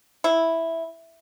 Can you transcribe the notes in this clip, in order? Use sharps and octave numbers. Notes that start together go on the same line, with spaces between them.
E4